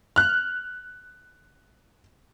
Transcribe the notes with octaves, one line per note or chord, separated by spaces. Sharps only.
F6 F#6